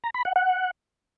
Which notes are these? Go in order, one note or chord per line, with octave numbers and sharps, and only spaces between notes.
A#5
B5
F#5
F#5